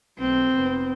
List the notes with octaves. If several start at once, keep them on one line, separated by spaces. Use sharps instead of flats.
B1 A3 C4
F1 B3